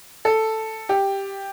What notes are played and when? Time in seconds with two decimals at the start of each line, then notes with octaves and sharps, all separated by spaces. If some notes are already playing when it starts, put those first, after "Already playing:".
0.25 A4
0.89 G4